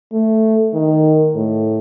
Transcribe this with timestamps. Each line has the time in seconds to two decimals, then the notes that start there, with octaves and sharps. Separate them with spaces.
0.13 A3
0.74 D#3
1.35 A2